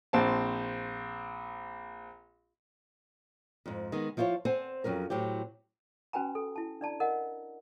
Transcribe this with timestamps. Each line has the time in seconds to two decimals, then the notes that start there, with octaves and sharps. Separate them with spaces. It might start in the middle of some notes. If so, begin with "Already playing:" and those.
0.13 A#1 C4 A5
3.66 F2 G#2
3.92 D#3 G#3 B3
4.17 F3 E4 F4 C5 C#5
4.45 C4 C5 F#5 G#5 A5
4.84 F2 F#3 C#4 A#4
5.10 A2 F#3 C4 G4
6.13 C#4 F#4 B4 G5 G#5 A#5
6.35 A4
6.56 E4 A5
6.81 D4 D5 A5 A#5
7.00 A#4 D#5 F#5